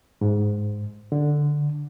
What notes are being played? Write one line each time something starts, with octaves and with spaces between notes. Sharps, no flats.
G#2
D3